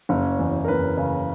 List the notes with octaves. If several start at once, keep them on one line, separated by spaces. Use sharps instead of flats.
F#1 C#4 C#5
E2
A#4
F#1 B4
C#3